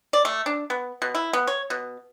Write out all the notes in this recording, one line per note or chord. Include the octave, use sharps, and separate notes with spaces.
D5
A3
D4
B3
B2
E4
B3
C#5
B2